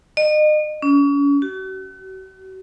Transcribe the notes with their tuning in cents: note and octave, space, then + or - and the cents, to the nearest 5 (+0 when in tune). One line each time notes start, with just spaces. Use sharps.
D#5 -35
C#4 +35
F#4 +45